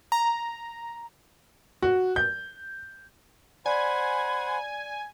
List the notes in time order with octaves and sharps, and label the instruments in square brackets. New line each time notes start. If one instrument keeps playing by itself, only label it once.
[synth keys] A#5
[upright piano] F#4
G6
[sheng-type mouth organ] C5 F#5 [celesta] D5 [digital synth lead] G#5 [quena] B5